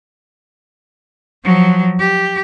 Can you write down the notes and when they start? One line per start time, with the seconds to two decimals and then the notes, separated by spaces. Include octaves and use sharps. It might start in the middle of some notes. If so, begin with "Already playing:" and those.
1.44 F3 F#3
2.00 G4